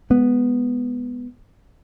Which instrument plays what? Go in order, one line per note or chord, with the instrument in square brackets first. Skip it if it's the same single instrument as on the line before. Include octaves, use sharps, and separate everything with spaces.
[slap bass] G#3 B3